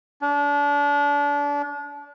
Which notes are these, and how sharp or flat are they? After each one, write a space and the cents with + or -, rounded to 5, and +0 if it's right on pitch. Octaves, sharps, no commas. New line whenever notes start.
D4 -30